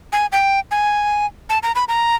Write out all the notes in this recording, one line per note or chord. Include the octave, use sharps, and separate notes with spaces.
G#5
G5
G#5
A5
A#5
B5
A#5